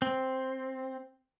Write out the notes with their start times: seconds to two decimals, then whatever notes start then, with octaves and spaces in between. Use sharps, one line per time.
0.02 C4